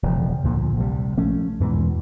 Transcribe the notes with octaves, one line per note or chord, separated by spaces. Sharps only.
E1 C#3 F3
D2 A#2 D3 F3
A#1 C3 D#3 G3
F3 A3 C#4
E2 G#2 B2 E3